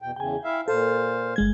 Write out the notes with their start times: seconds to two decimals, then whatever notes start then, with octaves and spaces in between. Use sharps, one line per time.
0.02 E2 B2 G5
0.16 E2 C#3 G5 G#5
0.44 E4 E5 F5
0.68 A#2 A4 C5 F5
1.36 G1 G#3 G#6